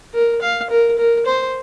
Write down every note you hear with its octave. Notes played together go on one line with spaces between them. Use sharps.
A#4
F5
A#4
A#4
C5